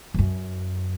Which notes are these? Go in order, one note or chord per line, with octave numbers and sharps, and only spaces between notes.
E2
F#2